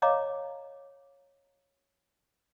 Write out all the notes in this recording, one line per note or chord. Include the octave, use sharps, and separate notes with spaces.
C#5 D#5 F5 A#5 D6